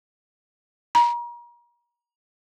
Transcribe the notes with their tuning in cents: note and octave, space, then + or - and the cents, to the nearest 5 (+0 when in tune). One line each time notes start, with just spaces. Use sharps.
A#5 +35